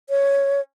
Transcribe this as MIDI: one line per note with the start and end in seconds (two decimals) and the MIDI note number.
0.10 0.61 73